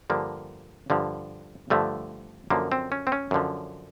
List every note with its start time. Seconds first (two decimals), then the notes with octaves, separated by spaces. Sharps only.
0.10 G2 D3 F3 A#3
0.90 G2 D3 F3
1.70 G2 D3 F3 A3
2.50 F#2 D3 F3 A#3
2.72 C4
2.92 C#4
3.07 C4
3.12 C#4
3.31 F#2 D3 F3